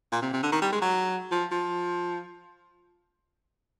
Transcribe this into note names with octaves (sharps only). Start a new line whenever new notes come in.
A#2
C3
C3
D3
D#3
G3
G#3
F#3
F3
F3